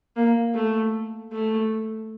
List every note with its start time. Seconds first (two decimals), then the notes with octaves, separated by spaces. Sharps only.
0.16 A#3
0.55 A3
1.32 A3